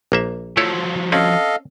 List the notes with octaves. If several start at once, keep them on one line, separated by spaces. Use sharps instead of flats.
A#1 A#3 E5
F3 F#3 A3 E4 C#5
C4 C#4 A4 D#5 F5